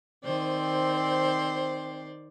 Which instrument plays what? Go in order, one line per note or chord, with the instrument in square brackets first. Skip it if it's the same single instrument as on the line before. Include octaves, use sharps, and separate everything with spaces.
[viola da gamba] D#3 C5 D5 [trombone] C4